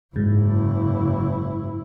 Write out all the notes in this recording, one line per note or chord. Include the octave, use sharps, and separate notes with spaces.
F#1 G#2 E4